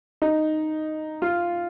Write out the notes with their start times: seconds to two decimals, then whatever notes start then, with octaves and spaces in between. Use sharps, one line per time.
0.22 D#4
1.22 F4